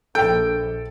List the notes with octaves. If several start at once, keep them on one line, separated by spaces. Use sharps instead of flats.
A#1 A4 G5